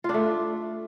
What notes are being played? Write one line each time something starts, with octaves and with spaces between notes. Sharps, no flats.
A3 D4 F4